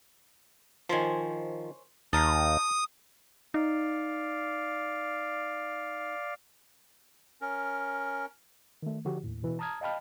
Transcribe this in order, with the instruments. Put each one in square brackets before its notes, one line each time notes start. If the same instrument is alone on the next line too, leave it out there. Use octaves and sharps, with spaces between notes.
[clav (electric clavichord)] D#3 F3 [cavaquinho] C5 C#5 G#5
[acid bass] D#2 [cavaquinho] D#4 F5 [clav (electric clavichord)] A5 [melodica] D#6
[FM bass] D#4 [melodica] D5 F5
[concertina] C#4 A#4
[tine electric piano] D#3 A3
D3 F3 F#4 G4
D#2 A2
B2 E3
A5 A#5 D#6 F6 G#6
D#5 F5 G5 A5 B5 F6